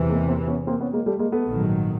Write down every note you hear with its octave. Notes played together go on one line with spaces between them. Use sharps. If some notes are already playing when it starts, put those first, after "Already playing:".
Already playing: E2 C3 E3
G#3 A#3
A#3 C4
B3 C#4
A#3 C4
B3 C#4
G#3 A#3
G3 A3
G#3 A#3
A3 B3
A#1 G#2 D#3 F#3